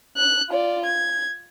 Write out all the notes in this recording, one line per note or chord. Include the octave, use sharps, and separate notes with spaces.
F#6
F4 D5
G#6